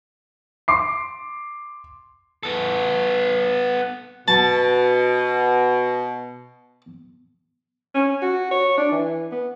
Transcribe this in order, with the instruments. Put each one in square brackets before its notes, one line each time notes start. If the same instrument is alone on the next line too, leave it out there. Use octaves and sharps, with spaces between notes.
[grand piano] C6 D6 C7
[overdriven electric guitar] B3 A4
[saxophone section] B2 [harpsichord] A5
[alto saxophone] C#4
F#4
C#5
D4
E3
B3